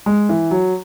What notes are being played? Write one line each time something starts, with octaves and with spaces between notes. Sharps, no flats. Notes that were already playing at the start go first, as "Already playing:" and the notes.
G#3
E3
F#3